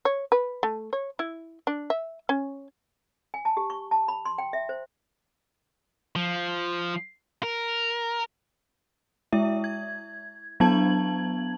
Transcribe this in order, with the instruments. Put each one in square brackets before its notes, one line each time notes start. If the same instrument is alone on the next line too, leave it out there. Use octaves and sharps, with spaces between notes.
[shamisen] C#5
B4
A3
C#5
E4
D4
E5
C#4
[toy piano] G#5
A5
G4
C#6
A5
B5
C6
G5
E5
C5
[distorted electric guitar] F3
A#4
[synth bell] G#3 E4 E5
G#6
F#3 B3 D4 A5 G#6 F#7